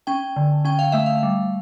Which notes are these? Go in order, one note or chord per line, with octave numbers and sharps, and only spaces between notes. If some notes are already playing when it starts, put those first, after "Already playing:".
C#4 G5
D3
C#4 G5
F5
A3 E5
F5
G3